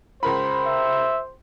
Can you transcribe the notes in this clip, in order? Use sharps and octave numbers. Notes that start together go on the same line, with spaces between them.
C#2 A#4 C5 B5
E5